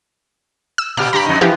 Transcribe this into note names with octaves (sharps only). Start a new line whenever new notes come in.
E6
A#2 G4 F6
G2 G4 A#5 B5
F2 D#4
E3 F3 B3 G4